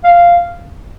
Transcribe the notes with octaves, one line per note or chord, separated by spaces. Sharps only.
F5